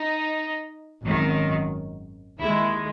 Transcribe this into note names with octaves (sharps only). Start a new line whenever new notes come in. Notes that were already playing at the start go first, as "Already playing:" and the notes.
Already playing: D#4
G#1 F#2 D#3
D#2 D#3 G#3 E4